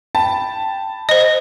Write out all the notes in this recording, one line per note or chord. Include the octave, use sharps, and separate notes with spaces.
G5 A5 B5
C5 D#5